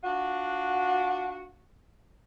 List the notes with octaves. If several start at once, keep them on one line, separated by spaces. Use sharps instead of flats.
D4 F4 F#4